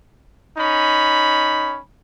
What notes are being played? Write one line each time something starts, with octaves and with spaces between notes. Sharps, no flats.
C#4 D#4 B5